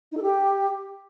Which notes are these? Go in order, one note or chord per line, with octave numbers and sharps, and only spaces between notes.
D#4
A4
G4